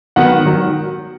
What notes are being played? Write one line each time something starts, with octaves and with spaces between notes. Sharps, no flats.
D#3 F#3 B3 F#5
D#3 F#3